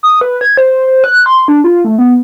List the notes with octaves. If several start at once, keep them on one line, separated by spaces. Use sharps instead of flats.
D#6
B4
G#6
C5
C5
F#6
C6
D4
F4
A3
B3